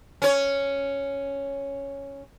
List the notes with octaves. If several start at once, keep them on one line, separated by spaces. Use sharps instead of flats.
C#4 C#5